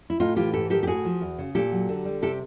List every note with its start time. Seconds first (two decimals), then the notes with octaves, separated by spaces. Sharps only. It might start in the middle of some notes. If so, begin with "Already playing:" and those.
0.10 E4
0.20 A2 D#4 F4
0.36 E3 F4 G4
0.53 G#2 G4 A4
0.70 D#3 G4 A4
0.83 G4
0.87 A2 F#4 G#4
1.05 F3
1.21 E2
1.38 C#3
1.55 A#2 G4 A4
1.72 F#3
1.89 D3
2.05 G3
2.22 C3 G4 A4